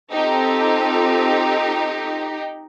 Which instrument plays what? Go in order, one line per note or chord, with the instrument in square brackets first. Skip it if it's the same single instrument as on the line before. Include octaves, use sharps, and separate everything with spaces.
[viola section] C4 F4 A4 [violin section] D#4 G4